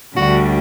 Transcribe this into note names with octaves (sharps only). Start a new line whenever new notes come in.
D2 D3 G3 F#4